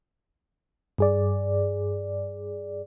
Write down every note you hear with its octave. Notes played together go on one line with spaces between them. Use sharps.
G2 G#4 D5